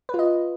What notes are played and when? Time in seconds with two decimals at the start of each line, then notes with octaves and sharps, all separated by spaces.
0.09 B4
0.14 F4
0.19 D#5